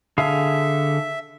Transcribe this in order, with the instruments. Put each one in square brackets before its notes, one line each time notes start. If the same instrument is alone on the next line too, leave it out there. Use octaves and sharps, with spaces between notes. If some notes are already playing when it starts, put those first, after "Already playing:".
[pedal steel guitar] D3 G#4 F5 [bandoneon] E5